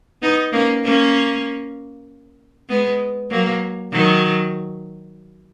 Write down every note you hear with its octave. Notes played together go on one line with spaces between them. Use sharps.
B3 D#4
A#3 C#4
A#3 C#4
G#3 B3
F#3 A#3
D#3 F#3